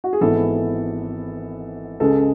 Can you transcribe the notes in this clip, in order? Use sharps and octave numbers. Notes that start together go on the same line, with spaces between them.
F#4
G#4
G#1 G#2 E3 B3 A4
C#2 C#3 G#3 A4